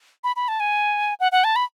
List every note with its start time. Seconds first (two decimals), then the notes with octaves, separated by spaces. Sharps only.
0.24 B5
0.36 B5
0.48 A5
0.60 G#5
1.20 F#5
1.32 F#5
1.44 A5
1.56 B5